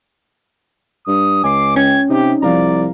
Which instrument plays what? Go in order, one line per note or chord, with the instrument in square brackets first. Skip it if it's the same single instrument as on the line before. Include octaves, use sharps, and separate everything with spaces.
[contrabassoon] G2 [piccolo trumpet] D#6
[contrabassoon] C#2 [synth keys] G#5 C7 [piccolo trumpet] D6
[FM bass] C#4 [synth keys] G5 [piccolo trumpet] G#6
[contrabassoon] C3 [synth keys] D#4 [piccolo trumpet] G4
[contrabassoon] C2 [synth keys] F3 F5 A#5 [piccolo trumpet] D5